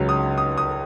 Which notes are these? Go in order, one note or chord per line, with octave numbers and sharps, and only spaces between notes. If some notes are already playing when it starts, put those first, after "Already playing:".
Already playing: C#2 C#3 F#3
D#6
D#6
D#6